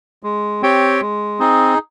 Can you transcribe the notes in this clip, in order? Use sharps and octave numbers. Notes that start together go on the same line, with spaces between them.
G#3
C4 G4 C#5 G5
G#3
C4 D#4 G#4